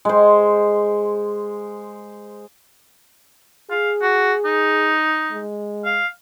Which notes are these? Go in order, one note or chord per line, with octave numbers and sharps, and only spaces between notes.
G#3 C5
G#4 F5
F#4
D#4
G#3
F5